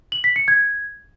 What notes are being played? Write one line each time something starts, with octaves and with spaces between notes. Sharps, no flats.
F#7
B6
C#7
G#6